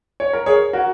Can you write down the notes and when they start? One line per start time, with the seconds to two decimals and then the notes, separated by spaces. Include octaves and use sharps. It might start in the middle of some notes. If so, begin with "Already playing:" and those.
0.20 C#5
0.33 A#4
0.46 G#4 C#5
0.73 F#4 A#4